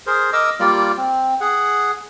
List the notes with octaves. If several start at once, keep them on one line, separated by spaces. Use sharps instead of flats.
G#4 A#4 C5
A#4 D#5 D6 E6
G3 A#3 F4 D5
C4
G#4 F#5